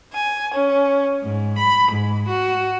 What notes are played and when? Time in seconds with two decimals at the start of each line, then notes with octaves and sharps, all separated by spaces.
0.13 G#5
0.53 C#4
1.23 G#2
1.58 B5
1.92 G#2
2.29 F#4